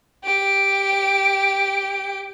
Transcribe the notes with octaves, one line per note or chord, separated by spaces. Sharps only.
G4 D7